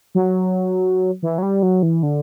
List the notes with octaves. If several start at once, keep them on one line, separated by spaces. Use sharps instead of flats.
F#3
E3
F#3
G3
F#3
E3
D3